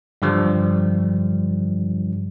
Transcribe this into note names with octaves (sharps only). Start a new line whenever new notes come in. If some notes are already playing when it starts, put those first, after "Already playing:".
G2 D3 F3 G3